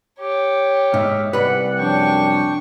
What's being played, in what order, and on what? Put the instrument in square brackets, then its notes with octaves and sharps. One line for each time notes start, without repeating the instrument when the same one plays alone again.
[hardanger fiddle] G4 C#5
[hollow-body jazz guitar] G#2 [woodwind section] D#5 E5 F6
[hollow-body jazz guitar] C2 B4 [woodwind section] D5 F#5
[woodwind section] F#2 F3 G5 [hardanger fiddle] D4 C#6